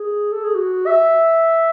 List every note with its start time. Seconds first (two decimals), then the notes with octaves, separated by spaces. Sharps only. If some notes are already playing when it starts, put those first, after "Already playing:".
Already playing: G#4
0.32 A4
0.44 G#4
0.55 F#4
0.86 E5